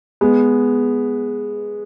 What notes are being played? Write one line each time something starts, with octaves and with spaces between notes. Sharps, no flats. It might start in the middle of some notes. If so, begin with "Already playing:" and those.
G#3 B3